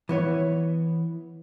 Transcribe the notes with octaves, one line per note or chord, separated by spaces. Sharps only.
E3 B3 C#5